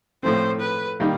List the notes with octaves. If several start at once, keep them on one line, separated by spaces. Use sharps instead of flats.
A2 F3 A3 C4 C5
B4
D#3 G3 A#3